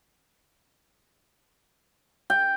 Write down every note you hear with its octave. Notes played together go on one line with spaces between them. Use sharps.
G5